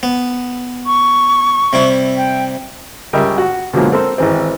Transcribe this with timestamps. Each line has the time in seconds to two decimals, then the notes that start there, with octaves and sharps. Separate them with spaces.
0.03 B3
0.86 C#6
1.73 C3 G3 E4
2.17 G5
3.13 C#2 G3 A#4 D#5 E5 G5
3.38 F#4
3.73 B2 D3 F3 F#3 G#3 A#3
3.92 C4 A4 A#4 C5
4.18 G#1 E3 C4